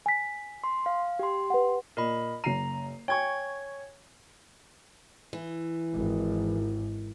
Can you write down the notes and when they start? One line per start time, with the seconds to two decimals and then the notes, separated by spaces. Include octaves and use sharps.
0.06 G#5 B6
0.64 C6
0.86 F5
1.19 G4 C6
1.50 B4 F#5
1.97 A#2 A#4 D#5 B5
2.44 F#1 A#5 C7 D#7
3.08 C#5 G5 G#5 C#6 G#6
5.33 E3
5.94 G#1